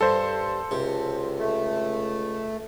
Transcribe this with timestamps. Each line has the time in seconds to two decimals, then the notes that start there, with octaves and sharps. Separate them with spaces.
0.01 G2 A4 C5
0.71 C#2 C3
1.39 A3